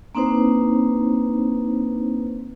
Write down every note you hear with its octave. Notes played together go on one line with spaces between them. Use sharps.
A#3 C4 D4 D#4 B4 C5